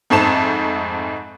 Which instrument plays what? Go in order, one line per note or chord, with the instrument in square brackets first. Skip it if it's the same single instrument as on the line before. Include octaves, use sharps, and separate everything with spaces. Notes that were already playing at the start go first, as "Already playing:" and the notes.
[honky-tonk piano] F2 G#2 A3 C4 A5 E7